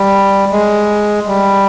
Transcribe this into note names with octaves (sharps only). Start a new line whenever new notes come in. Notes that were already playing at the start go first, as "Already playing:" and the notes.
Already playing: G3
G#3
G3